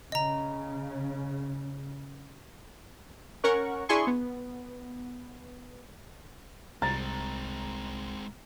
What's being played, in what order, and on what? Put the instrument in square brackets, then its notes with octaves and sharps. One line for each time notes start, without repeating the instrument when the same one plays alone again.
[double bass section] C#3 [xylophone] D#5 A#5
[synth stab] C#4 A#4 F#5 C#6
D4 E4 G#4 G#5 C6 C#6
B3
[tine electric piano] C2 [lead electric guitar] G#3 C4 [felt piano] A#5 A6